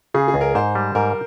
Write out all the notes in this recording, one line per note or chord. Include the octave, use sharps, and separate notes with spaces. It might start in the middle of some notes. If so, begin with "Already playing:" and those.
C#3 G#4
G#4
C#2
A#4
G#2 C5
G3
G#2 A#4